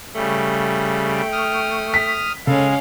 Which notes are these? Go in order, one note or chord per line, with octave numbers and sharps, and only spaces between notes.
C#3 G3 A3
G5
D#6 F6
B6
C#3 G#3 C#4 A4 F5